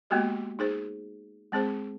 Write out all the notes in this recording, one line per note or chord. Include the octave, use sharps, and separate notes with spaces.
G#3 A#3 B3 F#4 G4 D#5
D#4 G#4 C5
G#3 C4 G#4 C5